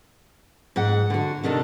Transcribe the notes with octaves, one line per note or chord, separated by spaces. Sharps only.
G#2 F#5
D3 F#4
C3 D#3 D4 A4